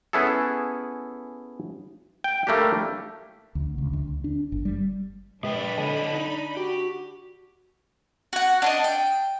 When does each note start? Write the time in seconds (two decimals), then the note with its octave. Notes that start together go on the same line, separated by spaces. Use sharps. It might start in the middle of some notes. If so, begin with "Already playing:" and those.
0.13 B3 C#4 E4 G#4 A4
2.24 G5
2.47 G3 A3 A#3 D4 G4
3.55 D2
3.78 C#2
3.93 D2
4.24 D4
4.52 G1
4.65 G3
5.43 A#2 G#3 D4 B4 G5 B5
5.78 D3 A4 C#5 D#5
6.13 D#4
6.57 F#4 G4
8.33 F#4 F#5
8.62 D4 C#5 D#5
8.84 G5